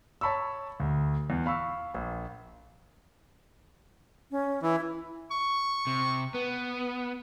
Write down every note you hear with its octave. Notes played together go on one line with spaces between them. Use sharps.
C#5 A5 B5 C#6 E6
D2
E2
F5 B5 C#6 E6
A#1
C#4
E3 E4
C#6
C3
B3 B4